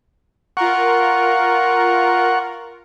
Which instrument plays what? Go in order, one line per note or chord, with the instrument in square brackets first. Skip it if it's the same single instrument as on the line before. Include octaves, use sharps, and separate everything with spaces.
[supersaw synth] F4 A#4 [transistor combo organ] F#5 C#6